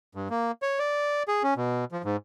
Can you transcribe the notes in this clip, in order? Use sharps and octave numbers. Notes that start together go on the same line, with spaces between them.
G2
A#3
C#5
D5
G#4
C#4
B2
F3
G#2